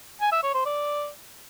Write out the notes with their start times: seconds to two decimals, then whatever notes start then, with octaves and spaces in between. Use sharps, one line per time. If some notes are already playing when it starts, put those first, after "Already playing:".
0.21 G#5
0.32 E5
0.43 C#5
0.54 C5
0.66 D5